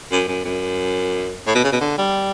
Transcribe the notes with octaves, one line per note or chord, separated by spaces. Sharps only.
F#2
F#2
F#2
A2
B2
C#3
B2
D3
G3